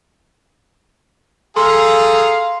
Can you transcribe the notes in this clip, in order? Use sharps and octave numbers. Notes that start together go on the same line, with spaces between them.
G#4 A4 F5 A#5 C6